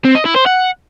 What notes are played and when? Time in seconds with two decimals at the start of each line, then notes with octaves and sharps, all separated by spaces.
0.05 C4
0.15 D#5
0.25 E4
0.36 C5
0.46 F#5